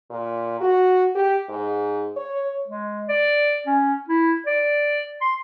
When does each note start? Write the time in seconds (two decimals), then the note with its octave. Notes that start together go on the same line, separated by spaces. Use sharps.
0.10 A#2
0.60 F#4
1.15 G4
1.49 G#2
2.16 C#5
2.68 G#3
3.08 D5
3.67 C#4
4.08 E4
4.47 D5
5.21 C6